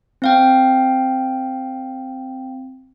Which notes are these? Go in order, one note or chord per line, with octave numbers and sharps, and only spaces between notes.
C4 F5 G5